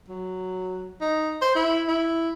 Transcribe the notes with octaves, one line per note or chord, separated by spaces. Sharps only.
F#3
D#4
C5
E4
E4